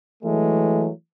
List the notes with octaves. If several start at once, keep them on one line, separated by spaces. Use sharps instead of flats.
E3 F#3 G#3 A3